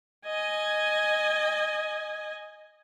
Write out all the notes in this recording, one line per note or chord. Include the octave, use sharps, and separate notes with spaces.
D#5 G#5